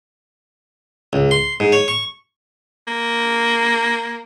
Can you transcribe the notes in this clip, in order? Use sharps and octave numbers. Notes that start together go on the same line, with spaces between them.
C#2
C6
G#2
C#5
C#6
A#3